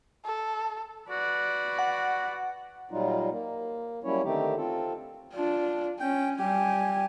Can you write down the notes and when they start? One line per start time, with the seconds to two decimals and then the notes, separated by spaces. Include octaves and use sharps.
0.25 A4
1.10 F#4 B4 D5
1.79 F#5
2.91 A#2 F#3 G3 D#4 F4
3.30 A#3
4.04 F#3 G3 A#3 C#4 E4 C#5
4.24 D3 D#3 A3 C4 D#4 G4
4.56 C4 F4 A4
5.34 D4 F4
6.00 C#4 G5
6.39 G3 G4 G#5